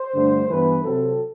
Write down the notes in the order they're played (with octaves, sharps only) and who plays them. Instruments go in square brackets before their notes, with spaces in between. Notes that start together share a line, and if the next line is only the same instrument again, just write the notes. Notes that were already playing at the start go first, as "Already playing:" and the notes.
Already playing: [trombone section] C5
G2 D3 A3
G2 E3 B3 B4
C3 F#3 C4 A4